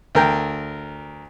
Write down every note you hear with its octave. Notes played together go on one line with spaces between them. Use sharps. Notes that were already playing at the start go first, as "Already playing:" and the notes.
D2 A#4 G5